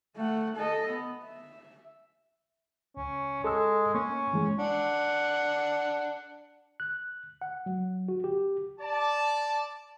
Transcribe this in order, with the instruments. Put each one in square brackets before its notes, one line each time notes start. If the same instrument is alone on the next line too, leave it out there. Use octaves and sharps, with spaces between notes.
[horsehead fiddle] A3 F#5
A4 D#5
B3
E5
[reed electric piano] C#2 [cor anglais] C#4
[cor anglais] G#3 [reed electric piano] A4 E6
[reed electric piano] A#3 [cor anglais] C#4
[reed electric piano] E3 G#3
[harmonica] D4 F#5
[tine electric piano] F#6
F#5
F#3
F#4
G4
[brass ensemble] D5 A5